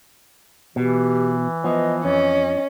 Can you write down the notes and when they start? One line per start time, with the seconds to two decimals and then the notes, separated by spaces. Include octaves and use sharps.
0.76 B2 E3 G4
1.64 F3 B3 D#5
2.05 F2 C#4 D#5